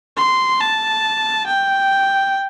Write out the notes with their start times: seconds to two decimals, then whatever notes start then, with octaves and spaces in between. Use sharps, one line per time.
0.17 C6
0.61 A5
1.47 G5